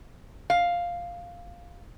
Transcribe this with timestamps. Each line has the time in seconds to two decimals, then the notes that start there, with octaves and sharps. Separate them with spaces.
0.50 F5